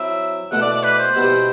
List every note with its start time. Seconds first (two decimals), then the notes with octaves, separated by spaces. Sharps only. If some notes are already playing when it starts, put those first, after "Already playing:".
Already playing: F#3 C4 E4 E5
0.51 B2 A3 E4 F#5
0.61 D5
0.73 D5
0.84 B4
0.99 C5
1.16 B2 G3 B3 E4